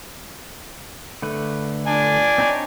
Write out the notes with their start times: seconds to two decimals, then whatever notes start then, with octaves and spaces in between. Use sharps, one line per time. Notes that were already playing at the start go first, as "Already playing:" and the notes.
1.22 D3 A3 B4
1.87 D4 G#5
2.38 C4 D#4 C#5